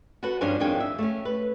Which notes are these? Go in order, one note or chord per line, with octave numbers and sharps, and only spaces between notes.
F#4 A4 B4 F#5
G2 F3 C#4 D4 C5 G#5
F2 D#3 D4 G#4 G5 G#5
E5
A3 C#4
B4